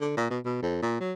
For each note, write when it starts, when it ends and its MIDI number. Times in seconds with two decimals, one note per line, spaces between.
0.01 0.13 50
0.17 0.30 46
0.30 0.39 47
0.45 0.59 47
0.62 0.79 41
0.82 1.00 46
1.01 1.13 54